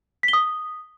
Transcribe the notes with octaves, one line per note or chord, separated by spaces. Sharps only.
B6
G7
D#6